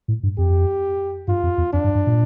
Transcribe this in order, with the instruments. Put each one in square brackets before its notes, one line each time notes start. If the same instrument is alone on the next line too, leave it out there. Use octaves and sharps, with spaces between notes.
[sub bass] A2
G2
[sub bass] F2 [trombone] G4
[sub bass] G2 [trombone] F4
[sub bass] F2
E2
[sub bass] F2 [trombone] D4
[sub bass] G2
G2
A#2